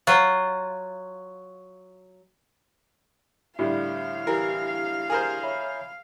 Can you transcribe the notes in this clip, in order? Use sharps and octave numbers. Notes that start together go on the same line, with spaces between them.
F#3 F4
A2 D3 G3 F5
E3 E4 G4 A#4
G#4 A#4 C5
C#5 E5 B5